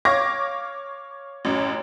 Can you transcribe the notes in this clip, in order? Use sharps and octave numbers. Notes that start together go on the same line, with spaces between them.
C#5 F5 C#6 D6 G#6 A#6
A1 F#2